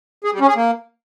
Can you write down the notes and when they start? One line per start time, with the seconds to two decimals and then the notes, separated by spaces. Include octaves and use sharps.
0.24 G#4
0.32 G3
0.40 C#4
0.48 G#4
0.56 A#3